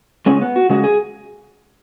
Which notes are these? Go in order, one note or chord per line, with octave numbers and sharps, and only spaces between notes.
C#3 G#3 C#4
B3
F#4
C#3 G#3 F#4
G#4